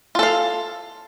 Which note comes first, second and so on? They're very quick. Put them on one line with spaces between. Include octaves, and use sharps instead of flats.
F4 A4 F5